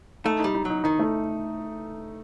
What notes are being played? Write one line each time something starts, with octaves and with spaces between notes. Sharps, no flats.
A3 D#4
G3 D#4
D#4
F#3 D#4
D#3 D#4
A3